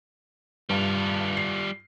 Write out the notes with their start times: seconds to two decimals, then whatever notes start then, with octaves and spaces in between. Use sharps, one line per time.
0.69 G2 G3 F4
1.37 C7